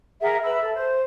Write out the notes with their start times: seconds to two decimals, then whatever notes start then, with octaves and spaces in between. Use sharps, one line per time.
0.22 G#4 A#4 E5 F#5
0.43 B4 E5 B5 E6
0.60 A4
0.73 C5